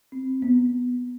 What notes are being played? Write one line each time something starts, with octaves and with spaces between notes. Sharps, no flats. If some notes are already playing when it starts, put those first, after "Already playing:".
C4
B3